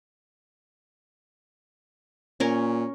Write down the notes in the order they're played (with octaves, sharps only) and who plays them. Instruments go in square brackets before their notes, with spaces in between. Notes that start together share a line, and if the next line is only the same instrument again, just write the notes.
[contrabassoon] A#2 [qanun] C#4 A#4 C#5